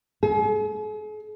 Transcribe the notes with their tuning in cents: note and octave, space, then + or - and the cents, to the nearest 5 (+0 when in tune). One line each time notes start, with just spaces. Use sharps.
G#4 +45